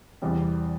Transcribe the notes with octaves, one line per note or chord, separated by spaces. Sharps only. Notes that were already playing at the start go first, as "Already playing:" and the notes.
E2 C3 E3 G3 C4